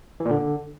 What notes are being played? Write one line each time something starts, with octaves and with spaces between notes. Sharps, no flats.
E3
A#2
D3